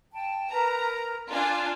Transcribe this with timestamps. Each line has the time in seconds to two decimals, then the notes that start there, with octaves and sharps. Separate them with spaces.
0.12 G5 A5
0.52 A#4 B4 A#5
1.32 D4 F4 G#5 F#6